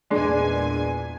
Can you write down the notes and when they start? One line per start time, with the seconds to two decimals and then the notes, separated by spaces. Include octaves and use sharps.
0.10 E2 A#2 G#3 D4 G#5